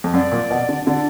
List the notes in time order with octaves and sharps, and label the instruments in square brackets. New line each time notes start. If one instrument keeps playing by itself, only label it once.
[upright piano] F2
[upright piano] F#2 [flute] D5
[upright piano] A#2
B2
D3
[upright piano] D3 [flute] D5